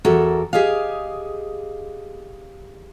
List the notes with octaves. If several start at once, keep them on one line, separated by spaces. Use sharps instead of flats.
E2 F#4 A4 A#4
G4 G#4 D#5 F5